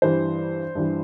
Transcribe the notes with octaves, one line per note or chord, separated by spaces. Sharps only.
G2 E3 G3 C5
G2 E3 G3